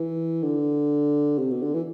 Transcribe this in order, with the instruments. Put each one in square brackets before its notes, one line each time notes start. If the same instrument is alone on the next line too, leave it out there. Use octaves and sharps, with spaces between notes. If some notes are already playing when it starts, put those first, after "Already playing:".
Already playing: [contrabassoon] E3
D3
C3
B2
D3
E3